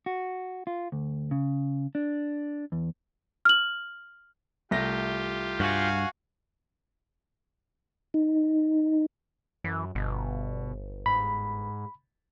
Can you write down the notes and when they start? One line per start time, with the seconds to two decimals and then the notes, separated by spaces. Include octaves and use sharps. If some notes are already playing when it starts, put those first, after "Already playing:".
0.06 F#4
0.67 F4
0.92 D2
1.31 C#3
1.95 D4
2.72 E2
3.45 F6 F#7
4.71 C2 A3 F4 G4 A#6
5.60 G2 F#4 F5 G#5
8.14 D#4
9.64 F#2 E3
9.95 G1 B2
11.06 G#2 B5